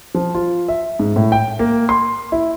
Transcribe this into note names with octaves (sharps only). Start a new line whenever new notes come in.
F3
F4
E5
G#2
A2
G5
A#3
C6
E4